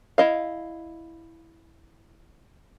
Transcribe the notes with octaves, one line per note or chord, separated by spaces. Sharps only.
E4 D#5 F5